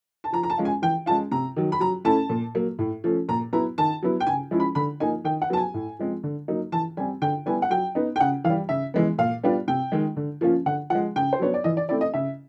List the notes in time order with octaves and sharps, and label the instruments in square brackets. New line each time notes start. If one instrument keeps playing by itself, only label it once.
[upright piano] A5
F3 A#5
A#5
A5
G#3 C#4 F4
G#5
E3 G5
G#3 C#4 F4 A5
C3 A#5
D#3 F#3
B5
F#3 A#5
A3 C#4 E4 A5
A#2
F#3 A#3
A2
F3 A3 C#4
A#2 A#5
F#3 B3 E4 A#5
D#3 A5
F#3 B3 E4
G5
C#3 G#5
F3 G#3 C#4 E4
B5
D3 B5
F3 A#3 D#4 G#5
D#3 G5
F#5
F#3 B3 A5
G#5
A2
F3 G#3 C4
D3
F#3 A#3 D#4
E3 A5
G3 C4 G#5
D3 G5
G3 B3 E4 G#5
F#5
F#3 G5
B3 D#4
G5
C#3 F#5
E3 F5
G3
C#3 E5
E3 G#3 B3
A#2 F5
G3 B3 D4 F4
C3 G5
D#3 G#3
D3
F3 A#3 C#4 F4
D3 F#5
F3 G#3 F#5
C#3 G5
C5
F#3 B3 D4 C#5
D5
E3 D#5
D5
A3 C4 E4 D5
D#5
C#3 E5